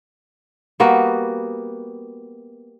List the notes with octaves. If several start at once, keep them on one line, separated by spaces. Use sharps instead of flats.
G3 A#3 B3 F#4